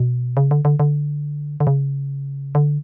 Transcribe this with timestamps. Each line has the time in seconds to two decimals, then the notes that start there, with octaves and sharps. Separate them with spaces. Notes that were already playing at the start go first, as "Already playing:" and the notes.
Already playing: B2
0.37 C#3
0.51 D3
0.65 D3
0.80 D3
1.60 D3
1.67 C#3
2.55 D3